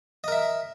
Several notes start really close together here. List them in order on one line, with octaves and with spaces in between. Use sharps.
D#5 A#4 E5